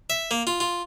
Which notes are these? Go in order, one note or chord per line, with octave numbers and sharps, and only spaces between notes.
E5
A#3
F4
F4